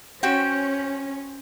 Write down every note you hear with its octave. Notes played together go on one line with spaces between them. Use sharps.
C#4 F#4 C5 G5